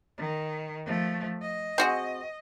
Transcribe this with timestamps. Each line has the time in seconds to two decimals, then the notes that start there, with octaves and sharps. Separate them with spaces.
0.18 D#3
0.86 F3 A3
1.42 D#5
1.78 C4 F#4 G#4